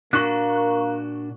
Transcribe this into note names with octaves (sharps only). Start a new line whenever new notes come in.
A#2 A#3 D4 F#4 C#6 F#6